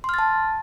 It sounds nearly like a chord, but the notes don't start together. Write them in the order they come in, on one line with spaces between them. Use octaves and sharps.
C6 F6 A6 A5